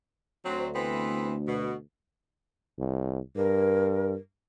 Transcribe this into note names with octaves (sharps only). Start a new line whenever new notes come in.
D2 F#3 C4
E3 B3 C4
B2
C2
G2 A#4